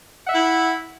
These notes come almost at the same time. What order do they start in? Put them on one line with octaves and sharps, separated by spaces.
F#5 E5 E4